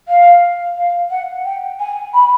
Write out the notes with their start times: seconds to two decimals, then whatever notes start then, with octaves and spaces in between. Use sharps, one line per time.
0.08 F5
0.76 F5
1.10 F#5
1.44 G5
1.79 G#5
2.13 B5